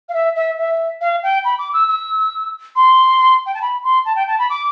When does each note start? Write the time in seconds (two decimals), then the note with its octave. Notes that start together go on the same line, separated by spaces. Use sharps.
0.09 F5
0.14 E5
0.35 E5
0.58 E5
1.01 F5
1.23 G5
1.44 B5
1.59 D6
1.73 E6
1.88 E6
2.75 C6
3.46 G5
3.54 A5
3.61 B5
3.84 C6
4.05 A5
4.16 G5
4.27 A5
4.39 B5
4.50 D6